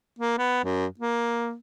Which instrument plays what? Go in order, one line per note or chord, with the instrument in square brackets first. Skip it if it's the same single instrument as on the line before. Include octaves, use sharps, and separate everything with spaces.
[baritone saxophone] A#3
B3
F#2
A#3